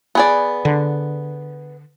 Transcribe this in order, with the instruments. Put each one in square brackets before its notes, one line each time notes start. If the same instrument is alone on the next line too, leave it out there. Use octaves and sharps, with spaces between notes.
[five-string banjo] B3 G#4 D5
[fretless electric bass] D3